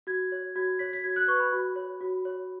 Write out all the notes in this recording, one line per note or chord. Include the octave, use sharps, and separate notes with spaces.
F#4 G#6
C#5
F#4 G#6
C#5 B6
B6
F#4 G#6
F#6
B4 C#6
B5
F#4
C#5
F#4
C#5